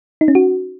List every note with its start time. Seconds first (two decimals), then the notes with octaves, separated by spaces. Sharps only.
0.21 D#4
0.28 C#4
0.35 F#4